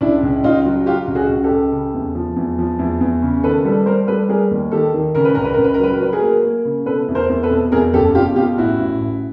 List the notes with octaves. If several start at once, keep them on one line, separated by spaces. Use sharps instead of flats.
C#2 D4 E4
C#2
C#2 D#4 F4
F#3
F#3 F4 G4
C#2
F#4 G#4
C#2
G4 A4
C#2
C#3
E2
F3
E2
F3
E2
E2
C#3
D#3 A4 B4
G3 A4 B4
G3 A#4 C5
G3 A4 B4
G3 G#4 A#4
D#2
D#3 G4 A4
D#3
C#3 A#4
B4
C#2 A#4
B4
C#2 A#4
B4
A#4
F#3 B4
A#4
F#3 B4
G#4 A#4
A#3
A#3
C#3
B2 A4 B4
E2
A#4 C5
E2
A4 B4
B2
E2 G#4 A#4
F#1 G4 A4
B2 F4 G4
B2 F4 G4
A1 E4 F#4
A1
A1